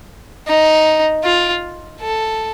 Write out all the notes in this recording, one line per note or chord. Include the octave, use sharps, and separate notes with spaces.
D#4
F4
A4